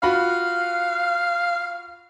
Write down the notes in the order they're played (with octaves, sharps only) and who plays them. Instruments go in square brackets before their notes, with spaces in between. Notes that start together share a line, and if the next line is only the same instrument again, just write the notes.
[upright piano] F4 F#4 B5 [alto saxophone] F5